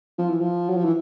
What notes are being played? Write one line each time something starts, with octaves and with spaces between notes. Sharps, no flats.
F3
E3
F3
F#3
F3
E3